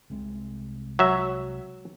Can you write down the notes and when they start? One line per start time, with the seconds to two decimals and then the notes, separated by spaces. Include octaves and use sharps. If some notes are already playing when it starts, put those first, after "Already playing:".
0.10 C2 C3 G#3
0.99 F#3 E5